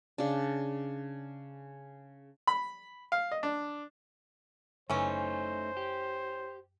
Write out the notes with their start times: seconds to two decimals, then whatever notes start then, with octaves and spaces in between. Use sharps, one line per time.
0.18 C#3 D4
2.47 B5
3.12 F5
3.32 D#5
3.43 D4
4.90 F#1 E3 A3 C#4 D#4 C5
5.77 G4